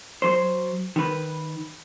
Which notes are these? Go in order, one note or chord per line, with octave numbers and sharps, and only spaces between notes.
F#3 C5
D#3 B4